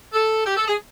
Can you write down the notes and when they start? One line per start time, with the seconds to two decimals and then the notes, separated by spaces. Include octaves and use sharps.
0.13 A4
0.46 G4
0.57 A4
0.68 G#4